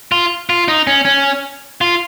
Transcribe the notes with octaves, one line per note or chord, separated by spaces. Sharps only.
F4
F4
D#4
C#4
C#4
F4